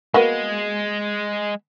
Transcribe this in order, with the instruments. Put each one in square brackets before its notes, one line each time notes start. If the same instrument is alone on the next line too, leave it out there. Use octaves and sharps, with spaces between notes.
[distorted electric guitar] G#3 [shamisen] A#3 B3 F#4